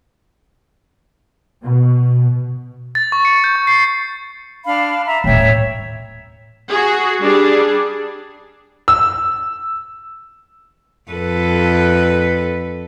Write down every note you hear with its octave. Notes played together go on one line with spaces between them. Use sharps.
B2
A6
C#6
C#7
G6
C#6
C7
D4 F5 B5
E5 A#5
D#1 A2 C#5 E5 G5
F#4 G#4
G3 D4 G#4
E6
F2 A4 B4